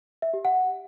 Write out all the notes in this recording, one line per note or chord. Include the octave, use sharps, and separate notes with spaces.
E5
G4
F#5